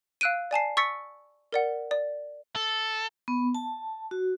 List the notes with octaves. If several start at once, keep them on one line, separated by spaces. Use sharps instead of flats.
F5 E6 F#6 D7 D#7
D5 G#5 A5 C7
C#6 E6 A6 B6 C#7
A#4 D5 F#5
D5
A4
B3
A5
F#4